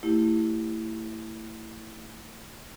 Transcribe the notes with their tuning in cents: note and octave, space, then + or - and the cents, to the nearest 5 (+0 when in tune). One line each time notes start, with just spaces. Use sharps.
A3 +30 E4 +0 G4 +0